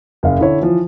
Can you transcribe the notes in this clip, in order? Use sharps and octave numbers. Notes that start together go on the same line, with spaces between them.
F#1 F5
D3 E4 C#5
E3 F3